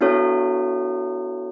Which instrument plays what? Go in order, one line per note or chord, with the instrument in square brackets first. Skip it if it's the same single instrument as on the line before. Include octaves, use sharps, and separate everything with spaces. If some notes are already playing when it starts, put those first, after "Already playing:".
[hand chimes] B3 D4 E4 F#4 A4 C#5